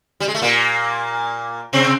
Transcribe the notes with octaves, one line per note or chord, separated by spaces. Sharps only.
G3
G#3
A3
A#2 A#3
C3 C4